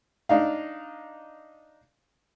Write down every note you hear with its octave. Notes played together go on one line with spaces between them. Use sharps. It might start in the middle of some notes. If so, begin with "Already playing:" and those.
D4 D#4 F5